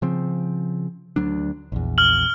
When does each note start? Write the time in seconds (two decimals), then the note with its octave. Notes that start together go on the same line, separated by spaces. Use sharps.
0.02 C#3 F3 C4
1.16 D2 F#3 D4
1.72 A#1 E2
1.98 F6 F#7